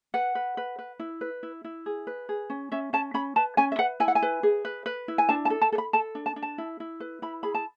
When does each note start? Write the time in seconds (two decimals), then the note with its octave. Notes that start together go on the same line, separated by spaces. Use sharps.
0.14 B4 F#5
0.35 B4
0.57 B4
0.79 B4
1.00 E4
1.21 B4
1.43 E4
1.64 E4
1.86 G#4
2.07 B4
2.29 G#4
2.50 C#4
2.72 C#4 E5
2.93 C#4 A5
3.14 C#4 B5
3.36 B4 A5
3.57 C#4 G#5
3.72 E5
3.79 B4 F#5
4.00 E4 G#5
4.08 F#5
4.15 G#5
4.22 B4
4.43 G#4
4.65 B4
4.86 B4
5.08 E4
5.18 G#5
5.29 D4 A5
5.45 A5
5.50 A4
5.61 A5
5.72 A4
5.78 B5
5.93 A4 A5
6.15 D4
6.26 A5
6.36 D4
6.42 A5
6.58 E4
6.80 E4
7.00 B4
7.22 E4 B5
7.43 G#4 B5
7.55 A5